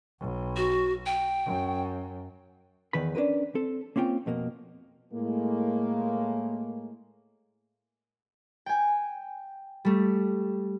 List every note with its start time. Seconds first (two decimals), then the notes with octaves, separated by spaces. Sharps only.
0.20 B1
0.56 F#4
1.06 G5
1.46 F#2
2.93 E2 D#3 B4 B5
3.15 C#4 D4 G4 A#4 B4
3.55 C4 A4
3.96 A#3 C4 C#4 F4 G5
4.26 F2 B2 A#3
5.12 A2 G#3 A#3
8.66 G5 G#5
9.85 G3 A3